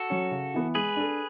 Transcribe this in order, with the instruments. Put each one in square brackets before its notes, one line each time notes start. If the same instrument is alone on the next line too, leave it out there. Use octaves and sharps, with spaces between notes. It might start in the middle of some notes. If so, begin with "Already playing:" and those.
Already playing: [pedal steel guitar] F#4 A4
[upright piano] F#3 C#4
C#3
E3 B3
[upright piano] G#3 [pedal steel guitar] G#4 B4
[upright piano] D4 A4